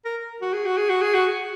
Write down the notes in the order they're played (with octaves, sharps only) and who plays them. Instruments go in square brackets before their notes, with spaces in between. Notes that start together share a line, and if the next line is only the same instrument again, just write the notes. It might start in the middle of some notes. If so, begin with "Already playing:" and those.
[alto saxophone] A#4
F#4
G#4
F#4
G#4
F#4
G#4
F#4